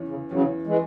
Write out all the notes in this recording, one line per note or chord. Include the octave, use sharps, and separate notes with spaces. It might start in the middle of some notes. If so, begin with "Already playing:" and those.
Already playing: E2 E3 C#4
C#3
E2 C#3 E3 F#3 C#4
E3 G#3